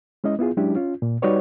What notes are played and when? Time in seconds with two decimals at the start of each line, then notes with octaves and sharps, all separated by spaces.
0.24 G#3 C#4 E4 D#5
0.39 B3 E4 F4 G#4
0.57 F#3 G#3 C#4 D4 E4 G4
0.76 C#4 F4
1.02 A#2
1.22 G3 D#4 F#4 B4 C#5 D5